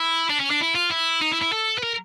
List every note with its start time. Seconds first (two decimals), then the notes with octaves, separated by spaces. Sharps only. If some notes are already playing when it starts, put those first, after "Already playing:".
Already playing: E4
0.30 D4
0.40 C#4
0.50 D4
0.61 E4
0.75 F4
0.91 E4
1.21 D#4
1.32 E4
1.42 E4
1.52 A4
1.78 B4
1.83 A#4